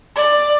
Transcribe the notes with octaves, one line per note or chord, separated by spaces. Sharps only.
D5